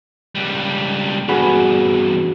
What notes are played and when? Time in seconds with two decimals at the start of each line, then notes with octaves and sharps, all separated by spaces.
0.35 C#2 G3
1.28 E2 G2 F#4 G#4 B4